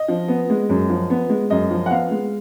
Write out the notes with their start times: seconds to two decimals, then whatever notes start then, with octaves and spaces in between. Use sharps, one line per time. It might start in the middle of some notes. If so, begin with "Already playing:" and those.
Already playing: D#5
0.08 F3
0.28 B3
0.50 G#3
0.69 F#2
0.90 F3
1.10 B3
1.29 G#3
1.50 F#2 D#5
1.71 F3
1.86 F#5
1.90 B3 F5
2.11 G#3